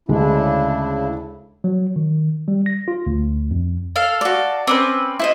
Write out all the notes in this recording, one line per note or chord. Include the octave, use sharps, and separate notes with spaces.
D2 C#3 G#3 D4 E4
F#3
D#3
G3
A#6
F4
D2
F2
A4 F5
F#4 D5
C4 C#4 B4 D6
E4 C5 D#5